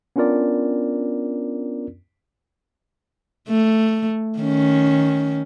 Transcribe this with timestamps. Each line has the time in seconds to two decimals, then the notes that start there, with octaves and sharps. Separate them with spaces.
0.16 B3 C#4 D4 F4 A#4 D5
3.49 A3
4.39 D#3 C#4